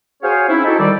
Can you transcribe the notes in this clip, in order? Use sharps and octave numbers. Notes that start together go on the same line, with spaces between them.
F#4 G#4 C5 C#5 F5 G#5
C4 C#4 D#4 E4
D#4 E4 F#4 G4 A4
D#3 G3 D5